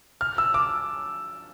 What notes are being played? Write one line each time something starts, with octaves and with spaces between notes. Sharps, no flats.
F6
E6
D6